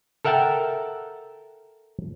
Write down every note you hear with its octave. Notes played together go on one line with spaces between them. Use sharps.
A4 A#4 E5 F#5 G5 A5